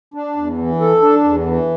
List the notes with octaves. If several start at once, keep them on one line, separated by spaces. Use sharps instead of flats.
D4
E2
E3
A4
D4
E2
E3